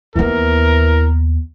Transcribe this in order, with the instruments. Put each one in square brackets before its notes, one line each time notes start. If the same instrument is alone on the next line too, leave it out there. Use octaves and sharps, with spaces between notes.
[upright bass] D#2 B3 [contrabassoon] E3 [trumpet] A#4